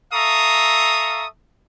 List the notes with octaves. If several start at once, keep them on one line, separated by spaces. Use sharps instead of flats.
A4 E5 F5 A#5 C#6 D#6